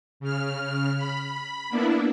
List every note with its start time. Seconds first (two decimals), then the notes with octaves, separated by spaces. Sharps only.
0.20 C#3 F6
0.97 B5
1.69 A#3 B3 D4 E4